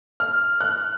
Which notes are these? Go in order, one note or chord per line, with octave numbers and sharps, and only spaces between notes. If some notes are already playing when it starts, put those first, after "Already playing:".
F6
F#6